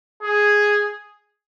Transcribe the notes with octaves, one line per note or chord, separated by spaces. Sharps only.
G#4